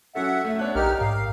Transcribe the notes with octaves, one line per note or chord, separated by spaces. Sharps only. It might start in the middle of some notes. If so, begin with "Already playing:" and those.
F#3 C#4 A4 E5 F#5
A3 E5
B3 D4 C#5 F#6
A#1 D#4 G4 A#4 F6
G#2 F5